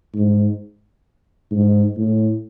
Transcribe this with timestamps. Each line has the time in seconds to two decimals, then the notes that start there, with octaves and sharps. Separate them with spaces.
0.15 G#2
1.51 G#2
1.97 A2